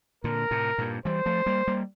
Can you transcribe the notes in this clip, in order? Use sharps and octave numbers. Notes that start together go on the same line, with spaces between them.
A#2 D3 A#4
A2 C3
G2 A#2
E3 G3 C5
F3 A3
G3 A#3
G3 A#3